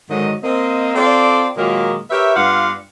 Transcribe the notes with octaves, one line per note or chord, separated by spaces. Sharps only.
G#2 D3 D#3 F#3 D#5
A#3 C4 D#5
C4 F4 A4 D5
A#2 D#3 F#3 G#3 A#3
G4 A#4 B4 C#5 E5
G2 B3 F4 D5 F5 F#5